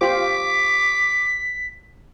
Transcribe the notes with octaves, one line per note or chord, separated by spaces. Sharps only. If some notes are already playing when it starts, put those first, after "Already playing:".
F4 G4 C5 D6 B6